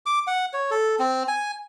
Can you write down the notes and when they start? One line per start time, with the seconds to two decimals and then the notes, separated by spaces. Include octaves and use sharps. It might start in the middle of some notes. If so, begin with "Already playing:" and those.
0.06 D6
0.27 F#5
0.53 C#5
0.71 A4
0.99 C4
1.28 G#5